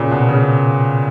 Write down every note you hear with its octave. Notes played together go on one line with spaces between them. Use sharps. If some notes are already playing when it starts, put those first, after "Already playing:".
Already playing: A#2 C#3
B2
C#3